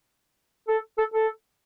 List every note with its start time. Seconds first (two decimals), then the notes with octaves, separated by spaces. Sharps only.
0.68 A4
0.98 A4
1.14 A4